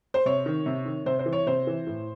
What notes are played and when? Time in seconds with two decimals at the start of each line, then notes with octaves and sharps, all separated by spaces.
0.14 C5
0.25 C3 C#5
0.46 D#3
0.66 C3
0.86 D#3
1.06 C3 C5
1.19 C5
1.26 E3
1.33 C#5
1.46 C3 C5
1.67 E3
1.87 A2